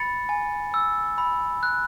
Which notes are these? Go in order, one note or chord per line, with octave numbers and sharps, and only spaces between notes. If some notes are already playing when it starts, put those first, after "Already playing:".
Already playing: B5 A6 C#7
G#5
E6
B5
F#6